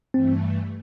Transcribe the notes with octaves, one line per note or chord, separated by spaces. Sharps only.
G2 E3 A3 C4